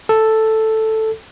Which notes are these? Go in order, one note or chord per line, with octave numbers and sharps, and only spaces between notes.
A4